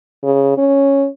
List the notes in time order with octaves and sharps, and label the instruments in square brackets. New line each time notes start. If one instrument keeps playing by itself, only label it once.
[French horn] C#3
C#4